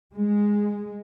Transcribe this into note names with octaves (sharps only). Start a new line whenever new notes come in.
G#3